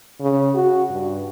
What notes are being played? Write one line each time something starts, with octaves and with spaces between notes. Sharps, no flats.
C#3
F#4
G2